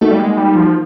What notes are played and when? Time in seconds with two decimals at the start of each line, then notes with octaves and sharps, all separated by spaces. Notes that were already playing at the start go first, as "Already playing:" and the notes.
0.01 A3 A#3 D#4 F#4
0.11 G3
0.19 G#3
0.37 G3
0.56 F3